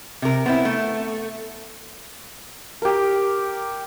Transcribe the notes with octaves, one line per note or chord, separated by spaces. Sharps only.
C3 A#4
B3 C4 E4
A3
G4 A#4